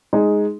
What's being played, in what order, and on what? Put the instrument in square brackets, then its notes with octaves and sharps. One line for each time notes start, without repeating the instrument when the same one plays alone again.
[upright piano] G#3 D#4 G#4